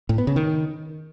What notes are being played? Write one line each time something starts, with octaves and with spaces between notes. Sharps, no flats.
A2
B3
C#3
D#3